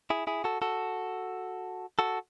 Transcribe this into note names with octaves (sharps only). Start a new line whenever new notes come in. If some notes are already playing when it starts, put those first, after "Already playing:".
E4 G#4
E4 G#4
F#4 A4
F#4 A4
F#4 A4